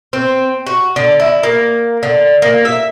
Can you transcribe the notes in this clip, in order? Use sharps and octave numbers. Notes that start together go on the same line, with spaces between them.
C4
F#4
D3
E4
A#3
D3
A#3
E5